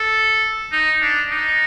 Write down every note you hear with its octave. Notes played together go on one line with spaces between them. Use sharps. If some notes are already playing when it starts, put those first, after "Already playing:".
Already playing: A4
D#4
D4
D#4